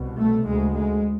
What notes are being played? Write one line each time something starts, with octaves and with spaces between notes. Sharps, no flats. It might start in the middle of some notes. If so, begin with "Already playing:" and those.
Already playing: C2 B2
A3
D2 C#3 G#3
G#3